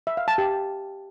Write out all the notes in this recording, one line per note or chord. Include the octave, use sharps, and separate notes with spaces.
E5
F5
A5
G4